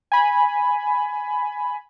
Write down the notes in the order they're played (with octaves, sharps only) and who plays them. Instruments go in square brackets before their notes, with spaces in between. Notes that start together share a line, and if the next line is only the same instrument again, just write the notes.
[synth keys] G#5 B5